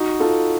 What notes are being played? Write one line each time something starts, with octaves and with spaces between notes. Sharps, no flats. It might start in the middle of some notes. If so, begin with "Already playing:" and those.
Already playing: D#4 F#4
F4 A4